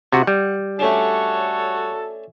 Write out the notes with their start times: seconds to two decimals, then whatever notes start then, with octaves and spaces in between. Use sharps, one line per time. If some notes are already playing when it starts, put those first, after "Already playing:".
0.13 C3 F#4 F#5
0.27 G3
0.79 A3 C#4 D4 F#4 A4 C#5